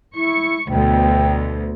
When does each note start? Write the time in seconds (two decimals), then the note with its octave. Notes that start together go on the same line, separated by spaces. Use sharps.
0.15 E4 C#6
0.69 D2 B2 G5